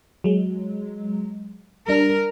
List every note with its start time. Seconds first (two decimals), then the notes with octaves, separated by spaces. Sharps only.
0.24 F#3 G#3
1.88 G3 D4 A#4